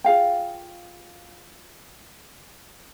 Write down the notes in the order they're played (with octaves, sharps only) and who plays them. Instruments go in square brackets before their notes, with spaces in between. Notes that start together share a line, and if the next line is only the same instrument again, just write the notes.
[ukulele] F4 G#4 F5 G5